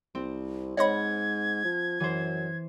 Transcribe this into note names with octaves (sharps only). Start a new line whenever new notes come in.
C2 C4
G#2 C#5 D#5 F#5 B5 G#6 A#6
F3
F#2 E3 C5